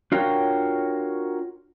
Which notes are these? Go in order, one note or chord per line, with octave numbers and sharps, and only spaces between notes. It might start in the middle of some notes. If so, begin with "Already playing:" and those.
D4 F4 F#4 A#4 C#5 G5